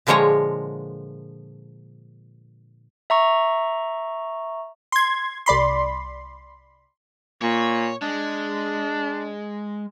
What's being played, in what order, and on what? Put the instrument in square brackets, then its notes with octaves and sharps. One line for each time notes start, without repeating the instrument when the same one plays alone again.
[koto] A#2 D3 F3 G#3 C#5 A#5
[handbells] E5 A#5 C#6
[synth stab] C6 G#6
C2 D5 B5 C6
[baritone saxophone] A#2 [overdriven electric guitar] C#5
[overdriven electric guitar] G#3 [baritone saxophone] D4